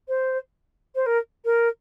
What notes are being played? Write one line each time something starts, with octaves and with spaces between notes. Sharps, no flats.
C5
C5
A#4
A#4